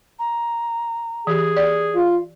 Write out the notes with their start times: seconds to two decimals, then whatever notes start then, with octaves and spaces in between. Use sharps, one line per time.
0.19 A#5
1.27 E3 G4 G#4
1.57 D5
1.95 F4 F5